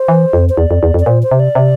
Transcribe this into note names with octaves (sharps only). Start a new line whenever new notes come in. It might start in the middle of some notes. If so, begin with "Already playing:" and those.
Already playing: C5
E3
F2
C5
E2 D5
F2
E2
F2
D5
A#2 C5
C5
C3
D5
C3